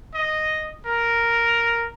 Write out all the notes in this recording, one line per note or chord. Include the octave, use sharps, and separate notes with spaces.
D#5
A#4